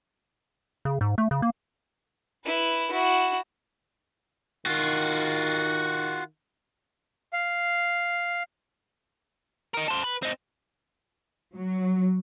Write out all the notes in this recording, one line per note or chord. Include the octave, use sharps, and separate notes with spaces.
C#3
G#2
A3
C#3
A#3
E4 B4
E4 F#4
D#3 F4 F#4
F5
D#4 A#4
A4 C5
B4
C4 D#4
F#3